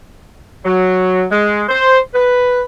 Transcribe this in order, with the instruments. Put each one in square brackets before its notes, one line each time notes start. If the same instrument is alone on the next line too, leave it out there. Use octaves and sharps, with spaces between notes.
[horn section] F#3
G#3
C5
B4